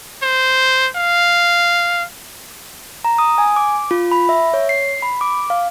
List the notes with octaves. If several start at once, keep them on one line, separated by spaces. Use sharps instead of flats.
C5
F5
A#5
D#6
G#5
D6
F4
B5
E5
C#5
C7
B5
D6
F5